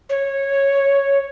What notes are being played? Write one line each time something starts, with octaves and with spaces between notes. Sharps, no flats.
C#5